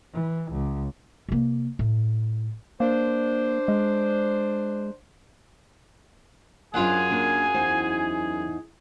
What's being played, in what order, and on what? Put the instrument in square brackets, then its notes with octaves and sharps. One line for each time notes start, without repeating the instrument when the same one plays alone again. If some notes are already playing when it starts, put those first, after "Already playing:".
[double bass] E3
C#2
[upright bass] C3 A#3
A2
[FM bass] A#3 [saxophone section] D4 C5
[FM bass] G#3
[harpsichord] F#2 F4 F#5 [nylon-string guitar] D4 C5 D#5 [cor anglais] G#4 [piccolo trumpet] G#5
[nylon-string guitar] A#3 D4
E2 D#4 C5